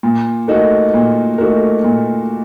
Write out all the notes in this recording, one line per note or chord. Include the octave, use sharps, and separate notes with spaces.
A#2
A3 D#4 F#4 A#4
A#2
A3 D#4 F#4 A#4
A#2